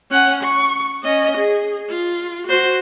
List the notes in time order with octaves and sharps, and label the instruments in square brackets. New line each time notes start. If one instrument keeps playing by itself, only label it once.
[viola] C#4 F#5
C#6
C#4 D#5
G#4
F4
F#4 C5